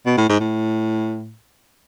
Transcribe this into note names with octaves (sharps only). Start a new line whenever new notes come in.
B2
A2
G#2
A2